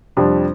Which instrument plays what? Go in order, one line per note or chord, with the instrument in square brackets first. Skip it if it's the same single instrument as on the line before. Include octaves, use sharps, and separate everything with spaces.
[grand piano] F2 C3 G3 D4 F4